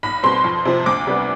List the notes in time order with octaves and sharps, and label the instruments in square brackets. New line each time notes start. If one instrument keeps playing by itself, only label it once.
[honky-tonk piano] B1 B5
B2 G3 C4 C6
F2
C3 F3 C4
D2 D6
C3 G3 B3 D4